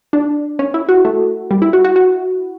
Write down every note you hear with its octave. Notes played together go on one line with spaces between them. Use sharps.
D4
C#4
E4
F#4
A3
G3
E4
F#4
F#4
F#4